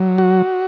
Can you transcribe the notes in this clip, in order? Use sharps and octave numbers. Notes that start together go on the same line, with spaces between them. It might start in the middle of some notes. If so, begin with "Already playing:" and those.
Already playing: F#3
F#4